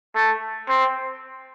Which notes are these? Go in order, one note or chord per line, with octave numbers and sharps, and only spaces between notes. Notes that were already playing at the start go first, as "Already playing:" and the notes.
A3
C4